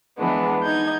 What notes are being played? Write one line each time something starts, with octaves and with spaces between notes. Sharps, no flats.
E3 G#3 B3 D4
D#4 G6 G#6